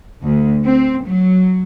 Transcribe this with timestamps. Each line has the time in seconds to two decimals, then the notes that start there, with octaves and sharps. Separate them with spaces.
0.25 D2
0.65 C4
1.06 F#3